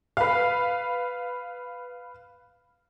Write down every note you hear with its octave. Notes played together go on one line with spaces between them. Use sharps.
B4 F5